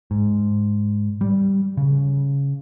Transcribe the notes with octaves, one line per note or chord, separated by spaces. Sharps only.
G#2
G3
C#3